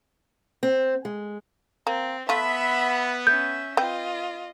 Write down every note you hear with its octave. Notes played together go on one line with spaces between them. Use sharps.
C4
G#3
A#3 C4
A3 B3 F4 E5 B5
C#4 E5 G6
C4 F4 B4 D#5 G5